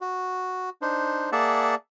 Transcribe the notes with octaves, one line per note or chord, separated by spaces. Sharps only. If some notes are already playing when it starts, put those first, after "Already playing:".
F#4
D4 D#4 C5
A#3 G#4 D5 E5 F#5 A5